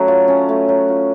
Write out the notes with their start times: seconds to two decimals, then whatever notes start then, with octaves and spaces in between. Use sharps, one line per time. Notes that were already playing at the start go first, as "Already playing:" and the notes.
Already playing: F#3 A3 C#4
0.08 F4
0.28 C#4
0.49 A3
0.69 F#3
0.89 F4